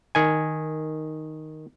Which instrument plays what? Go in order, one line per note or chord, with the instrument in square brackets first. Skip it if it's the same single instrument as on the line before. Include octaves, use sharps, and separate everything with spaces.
[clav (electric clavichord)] D#3 G#5